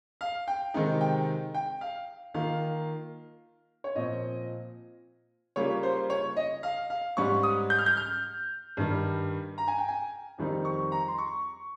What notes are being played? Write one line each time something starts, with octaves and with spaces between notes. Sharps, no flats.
F5
G5
C3 D#3 G#3 C4 D#4
G5
G5
F5
D#3 A#3 F4 F5
C#5
A#2 F3 C4 D#5
C#3 G3 A#3 F4 C#5
C5
C#5
D#5
F5
F5
G#2 G3 C#4 C#6
D#6
G6
F6
G6
F6
G2 D#3 G3
A#5
G#5
G5
G#5
F2 D#3 G3 C4 D#4
C#6
A#5
C6
C#6